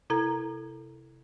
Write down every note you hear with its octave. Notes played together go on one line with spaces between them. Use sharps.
C3 E4 A4 A#5 G#6